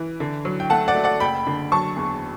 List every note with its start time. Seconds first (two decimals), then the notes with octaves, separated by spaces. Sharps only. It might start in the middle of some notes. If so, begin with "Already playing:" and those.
Already playing: E3
0.20 D3
0.45 F#3
0.60 G5
0.70 A3 F#5 A5
0.88 D5 F#5
0.95 A3
1.04 D5 F#5
1.20 F#1 G5 B5
1.47 D3
1.72 F#3 A5 C#6
1.96 E2